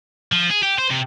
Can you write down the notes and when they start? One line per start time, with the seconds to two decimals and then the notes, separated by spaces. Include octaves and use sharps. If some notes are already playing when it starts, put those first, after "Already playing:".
0.32 F3
0.50 G#4
0.63 G4
0.79 C5
0.91 C3